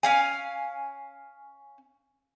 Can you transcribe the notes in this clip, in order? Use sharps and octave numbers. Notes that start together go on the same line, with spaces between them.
C#4 F5 G#5